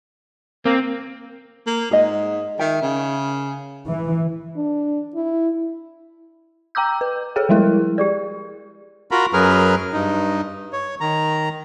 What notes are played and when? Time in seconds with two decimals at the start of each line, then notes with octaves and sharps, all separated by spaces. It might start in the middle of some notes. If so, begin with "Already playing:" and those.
0.65 A#3 C4
1.67 A#3
1.91 G#2 G#4 D#5
2.59 D#3 E5 G5
2.82 C#3
3.89 E3
4.56 D4
5.15 E4
6.75 G5 A#5 D6 E6 G6
7.01 B4
7.36 G#4 A4 C#5 G5
7.49 F3 G3 G#3 E4 A#4
7.98 G4 G#4 D5
9.11 F4 F#4 A#4 A#5 B5
9.33 F#2 F#3 G#4 A#4 B4 F6
9.93 G2 D#4
10.73 C#5
11.01 D#3 A#5